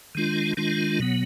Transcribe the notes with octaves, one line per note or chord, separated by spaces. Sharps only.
D#3 G#3 D4 F4
D#3 G#3 D4 F4
B2 F#3 B3